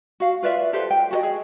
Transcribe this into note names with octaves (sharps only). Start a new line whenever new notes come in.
F#4 F5
F4 B4 D5 E5
G4 A4 B4 C5
G5
F#4 A4 D#5
G#4